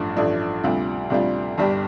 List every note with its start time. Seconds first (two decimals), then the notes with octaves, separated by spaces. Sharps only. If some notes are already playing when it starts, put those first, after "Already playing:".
Already playing: A1 G2 F3 A3 D4
0.16 A1 G2 F3 A3 D4
0.63 D2 C3 G3 D4 F4
1.10 D2 C3 G3 D4 F4
1.58 G1 G2 G3 D4 G4